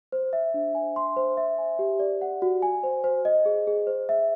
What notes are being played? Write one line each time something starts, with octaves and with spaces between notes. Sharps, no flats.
C5
E5
D4
G#5
C6
C5
E5
G#5
G4
D5
F#5
F#4
G#5
C5
C5
D#5
G#4
G#4
C5
E5